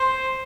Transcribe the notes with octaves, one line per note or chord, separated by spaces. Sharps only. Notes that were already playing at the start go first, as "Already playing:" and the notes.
Already playing: C5